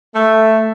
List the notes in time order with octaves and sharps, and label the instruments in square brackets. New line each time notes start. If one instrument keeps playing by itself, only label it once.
[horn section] A3